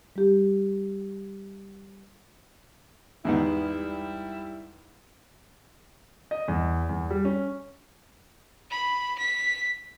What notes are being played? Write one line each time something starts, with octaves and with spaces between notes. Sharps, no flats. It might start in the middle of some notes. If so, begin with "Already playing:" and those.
G3 G4
E2 G#2 G3 B3 E4
D#5
E2
E2
G3
C#4
B5
B6